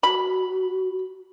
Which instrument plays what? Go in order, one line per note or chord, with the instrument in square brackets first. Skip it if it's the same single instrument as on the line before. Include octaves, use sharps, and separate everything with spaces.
[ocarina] F#4 [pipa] B5